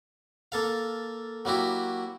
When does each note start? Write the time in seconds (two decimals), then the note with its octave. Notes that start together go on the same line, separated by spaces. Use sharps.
0.52 A#3 A4 F5
1.45 F#3 A#3 E4 F#4 G4